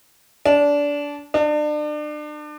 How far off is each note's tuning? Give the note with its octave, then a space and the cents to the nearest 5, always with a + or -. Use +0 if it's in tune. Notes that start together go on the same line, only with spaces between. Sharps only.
D4 -20
D4 +35